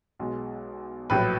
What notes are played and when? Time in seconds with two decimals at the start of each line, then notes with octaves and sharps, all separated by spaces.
0.19 B1 B2 G#3
1.10 A#1 A2 F#3 B4